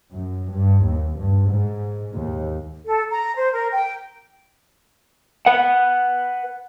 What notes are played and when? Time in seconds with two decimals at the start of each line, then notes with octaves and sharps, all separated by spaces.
0.12 F#2
0.50 G2
0.85 D#2
1.18 G2
1.51 G#2
2.14 D#2
2.86 A4
3.09 A#5
3.36 C5
3.53 A#4
3.72 G5
5.46 B4 F#5